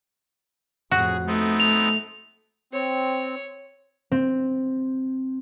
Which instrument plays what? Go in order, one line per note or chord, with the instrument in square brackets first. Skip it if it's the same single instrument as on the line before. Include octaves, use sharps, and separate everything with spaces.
[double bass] F2 A2 [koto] F#4 [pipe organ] G#4
[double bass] A3 [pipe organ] B3 C4 D#4
[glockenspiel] F7
[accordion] C4 [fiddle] C#5
[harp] C4